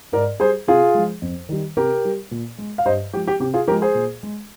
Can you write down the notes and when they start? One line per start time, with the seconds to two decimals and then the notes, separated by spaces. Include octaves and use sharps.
0.12 G#2 A#4 D5
0.40 G3 G#4 C5
0.68 C3 F4 G#4
0.95 F3 G#3
1.22 F2
1.49 D#3 G3
1.77 C3 G4 A#4
2.05 G3
2.31 A#2
2.58 G#3
2.78 F5
2.85 G2 C5 D#5
3.13 F3 G#3 G4
3.27 G4
3.40 C3 G4
3.54 F4 G#4
3.68 F3 G4 A#4
3.71 G#3
3.82 G#4 C5
3.95 A#2
4.23 G#3